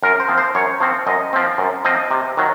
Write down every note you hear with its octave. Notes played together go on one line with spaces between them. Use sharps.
F#2 A#4
C5
F3 C4
C5
F#2 C#5
F3 C4
F#2 D#5
F3 C4
F#2
F3 C4 D#5
C3
D#3 F#3